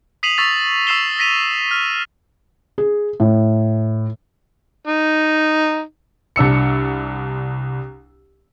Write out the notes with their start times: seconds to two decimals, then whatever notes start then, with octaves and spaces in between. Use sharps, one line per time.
0.23 D#6 B6 C7 D#7 F7 F#7
0.38 C#6 E6 A6 B6 F7
0.87 C#6 E6 B6 C7 E7 G7
1.19 A#6 B6 D#7 F7
1.71 F6
2.78 G#4
3.20 A2
4.87 D#4
6.36 C2 D4 E6 C#7